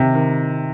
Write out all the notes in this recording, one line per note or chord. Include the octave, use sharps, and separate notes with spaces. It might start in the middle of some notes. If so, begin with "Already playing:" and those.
Already playing: C3 D#3
D#3